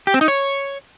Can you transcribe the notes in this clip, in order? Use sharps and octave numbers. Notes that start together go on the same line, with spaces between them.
G4
C4
D#4
C#5